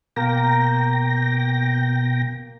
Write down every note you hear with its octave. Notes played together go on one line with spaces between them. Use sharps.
B2 A#3 G5 A#6